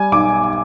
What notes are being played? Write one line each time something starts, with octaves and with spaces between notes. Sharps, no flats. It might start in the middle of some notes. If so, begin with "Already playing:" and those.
Already playing: G3 G#5
B1 D6